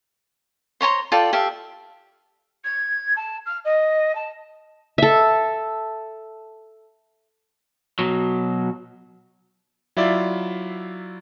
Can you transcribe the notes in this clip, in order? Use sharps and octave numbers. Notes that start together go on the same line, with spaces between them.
C5 C#5 A#5 C6
F4 A4 D5 G5
G4 A4 E5 F5
G#6
A5
F6
D#5
A5
A4 E5
B2 F#3
F#3 E4 F4 D5 E5